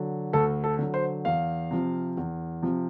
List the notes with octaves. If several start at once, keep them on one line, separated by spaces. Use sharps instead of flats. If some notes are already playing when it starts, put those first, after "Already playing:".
Already playing: D3 F#3
D2 A4
A4
D3 F#3
C5
E2 F5
C3 F3
E2
C3 F3